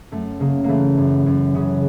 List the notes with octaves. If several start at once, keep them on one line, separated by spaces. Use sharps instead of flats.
F#2 A3
C#3 A#3
E3 A3 A#3
F#2
F#2
C#3